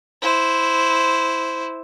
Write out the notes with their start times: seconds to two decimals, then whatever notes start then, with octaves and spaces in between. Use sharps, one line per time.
0.22 E4 C5